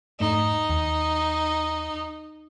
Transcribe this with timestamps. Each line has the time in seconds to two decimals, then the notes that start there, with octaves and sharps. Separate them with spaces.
0.20 F2 G#2 A3 D#4
0.69 D#2